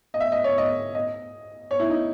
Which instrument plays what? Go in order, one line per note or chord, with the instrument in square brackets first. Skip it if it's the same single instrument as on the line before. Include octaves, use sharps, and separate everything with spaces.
[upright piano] D#5
E5
D#5
C#5
D#5
D#5
C#5
E4
D#4